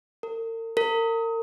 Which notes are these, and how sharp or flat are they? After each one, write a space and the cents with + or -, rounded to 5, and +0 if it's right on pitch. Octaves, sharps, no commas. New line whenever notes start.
A#4 -45
A#4 -35